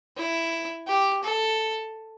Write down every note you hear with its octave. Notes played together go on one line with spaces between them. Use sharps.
E4
G4
A4